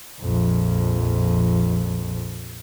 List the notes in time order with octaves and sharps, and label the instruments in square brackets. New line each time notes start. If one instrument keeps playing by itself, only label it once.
[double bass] A#1 F2